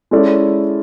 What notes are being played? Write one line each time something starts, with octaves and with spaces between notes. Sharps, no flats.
G#3 C#4 E4 A4 D5